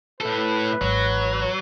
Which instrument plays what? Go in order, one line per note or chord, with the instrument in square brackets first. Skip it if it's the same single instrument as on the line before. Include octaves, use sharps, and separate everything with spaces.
[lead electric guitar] A2 A4 [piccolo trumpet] B4
[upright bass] G#1 E3 [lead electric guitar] F#3